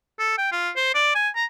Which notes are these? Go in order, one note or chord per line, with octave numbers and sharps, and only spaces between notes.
A4
G5
F4
C5
D5
G#5
A#5